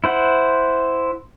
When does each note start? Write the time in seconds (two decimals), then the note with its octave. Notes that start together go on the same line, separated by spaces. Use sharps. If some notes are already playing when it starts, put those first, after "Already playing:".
0.04 E4 C5 F#5